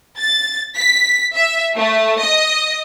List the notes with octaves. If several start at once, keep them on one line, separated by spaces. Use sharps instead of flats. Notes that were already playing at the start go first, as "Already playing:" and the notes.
A6
B6
E5
A3
D#5